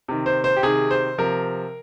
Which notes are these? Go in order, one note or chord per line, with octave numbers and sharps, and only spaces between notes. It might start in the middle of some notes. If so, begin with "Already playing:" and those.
C3 D#3
C5
C5
G4
C3 D#3 G#4
C5
C3 F3 A#4